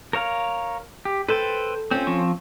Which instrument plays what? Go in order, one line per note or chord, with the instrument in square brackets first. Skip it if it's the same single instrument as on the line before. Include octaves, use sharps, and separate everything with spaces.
[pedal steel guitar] A#4 C#5 F5
G4
[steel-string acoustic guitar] A4 [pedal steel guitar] B4 C5 G5
[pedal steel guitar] C4 [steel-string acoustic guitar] C#4 F4
[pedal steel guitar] F3 C4 C#6